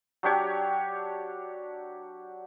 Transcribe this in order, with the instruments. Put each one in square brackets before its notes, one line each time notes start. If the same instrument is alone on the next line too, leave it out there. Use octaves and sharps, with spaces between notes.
[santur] F#3 D4 G4 C#5